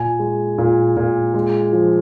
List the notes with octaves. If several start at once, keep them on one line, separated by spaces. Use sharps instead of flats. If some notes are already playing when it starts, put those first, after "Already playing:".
Already playing: A#2 G#5
G#3
A#2
A#2
G#3
F3